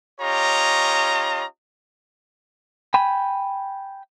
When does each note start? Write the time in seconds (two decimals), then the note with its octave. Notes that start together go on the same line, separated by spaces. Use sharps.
0.21 C#4 F4 G4 C#5 D#5 A#5
2.94 G5 G#5 B5